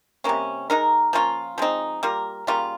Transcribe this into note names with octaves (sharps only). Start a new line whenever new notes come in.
C3 G3 A#3 C#4
G#3 D#4 A#4
F3 A#3 C#4 F4
F3 G#3 C4 D#4
G3 A#3 F4 A#4
C#3 G3 A#3 F4